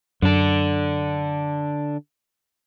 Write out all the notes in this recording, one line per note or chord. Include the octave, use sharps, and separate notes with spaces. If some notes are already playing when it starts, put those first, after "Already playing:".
F#2 D3 D4